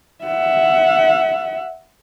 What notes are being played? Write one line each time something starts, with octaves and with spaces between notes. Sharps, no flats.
E5 F#5